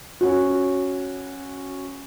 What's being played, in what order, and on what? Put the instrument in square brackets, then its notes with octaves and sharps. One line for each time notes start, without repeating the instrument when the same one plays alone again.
[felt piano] C#4 F#4